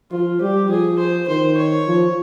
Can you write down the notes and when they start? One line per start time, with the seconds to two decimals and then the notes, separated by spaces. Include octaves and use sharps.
0.12 F3 F4
0.41 G3 G4
0.69 F3 G#4
0.99 C5
1.28 D#3 C5
1.58 C#5
1.87 F3